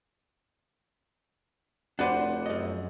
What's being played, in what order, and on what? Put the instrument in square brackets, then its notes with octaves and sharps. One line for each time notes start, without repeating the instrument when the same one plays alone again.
[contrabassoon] F1 [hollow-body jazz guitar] D4 G4 D5 [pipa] F#4 B4 C5 [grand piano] F#5
[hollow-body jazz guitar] F#2 D#5